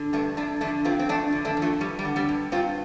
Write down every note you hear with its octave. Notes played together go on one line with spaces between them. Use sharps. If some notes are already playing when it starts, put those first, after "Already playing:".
Already playing: D3
G2 A3 D4
F2 A3 D4
D3 A3 D4
F2 C4 F4
C4
F2 A3 D4
D3
A3 D4
F2
F3 A3
G2 G3
G3
D3
G3 C4
G2
G2 C4 F4